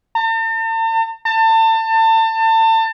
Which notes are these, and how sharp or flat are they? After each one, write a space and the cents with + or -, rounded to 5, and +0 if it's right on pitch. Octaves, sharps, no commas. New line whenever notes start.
A5 +45
A5 +30